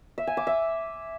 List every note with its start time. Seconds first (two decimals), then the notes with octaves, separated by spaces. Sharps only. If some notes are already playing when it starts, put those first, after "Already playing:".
0.18 E5
0.27 G#5
0.37 D6
0.47 E5